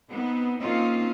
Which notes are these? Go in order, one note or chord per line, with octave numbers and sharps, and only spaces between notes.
B3 C4 D#4
A#3 C4 C#4 D#4 F4